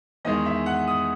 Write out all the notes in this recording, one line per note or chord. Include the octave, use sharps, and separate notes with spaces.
E2 D#3 G#3 D#5
E5
F#5
D#6